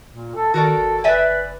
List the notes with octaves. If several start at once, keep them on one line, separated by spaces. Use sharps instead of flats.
A#2
A4
D#3 F#4 A4 A#4 D5
G#1
F#1 B4 D5 E5 G#5